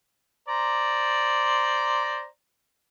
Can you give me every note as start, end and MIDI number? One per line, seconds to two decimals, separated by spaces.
0.48 2.26 72
0.48 2.26 74
0.48 2.26 82